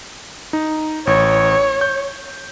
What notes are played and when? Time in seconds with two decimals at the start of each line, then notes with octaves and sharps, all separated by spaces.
0.53 D#4
1.07 A1 C#5
1.81 G6